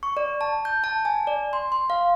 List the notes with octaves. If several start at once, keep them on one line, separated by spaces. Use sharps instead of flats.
C#6
D5
A5
G6
A5
G#5
D5
C6
C6
F5